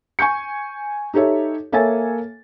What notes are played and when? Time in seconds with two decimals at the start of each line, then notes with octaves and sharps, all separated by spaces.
0.19 G#5 C#6 G6 C#7
1.14 D#4 G4 A4 C#5 E5
1.72 A#3 A4 C#5 E5 G#5 A6